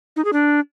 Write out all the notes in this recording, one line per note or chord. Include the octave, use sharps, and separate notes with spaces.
D#4
G#4
D4